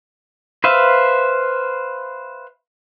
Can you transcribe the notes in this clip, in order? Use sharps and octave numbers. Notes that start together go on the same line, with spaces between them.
B4 C5 E5 F5